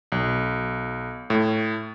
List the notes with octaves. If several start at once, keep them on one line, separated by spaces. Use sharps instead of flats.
B1
A2